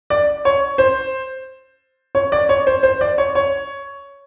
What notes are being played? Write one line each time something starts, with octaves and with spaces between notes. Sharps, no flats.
D5
C#5
C5
C#5
D5
C#5
C5
C5
D5
C#5
C#5